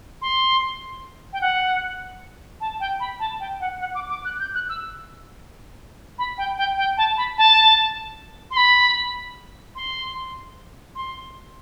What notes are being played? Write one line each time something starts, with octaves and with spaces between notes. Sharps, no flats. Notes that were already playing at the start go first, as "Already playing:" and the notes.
C6
G5
F#5
A5
G5
B5
A5
G5
F#5
F#5
D6
D6
F#6
G6
F#6
E6
B5
G5
G5
G5
A5
B5
A5
C6
B5
C6
C6